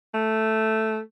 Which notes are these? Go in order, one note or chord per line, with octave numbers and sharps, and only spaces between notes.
A3